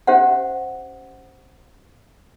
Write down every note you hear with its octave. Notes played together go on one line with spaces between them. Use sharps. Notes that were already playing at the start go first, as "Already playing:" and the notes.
C#4 G4 C5 E5 F#5